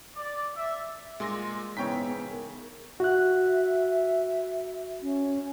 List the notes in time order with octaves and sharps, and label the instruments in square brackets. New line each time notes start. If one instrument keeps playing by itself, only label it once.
[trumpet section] D5
E5
[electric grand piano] A#2 C6 A#6 [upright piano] G#3
[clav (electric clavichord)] G#2 C#3 E3 [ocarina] B3 [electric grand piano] C#5 G5 B6
[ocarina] A#4
[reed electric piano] F#4 F#6 [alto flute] E5
[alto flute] C#4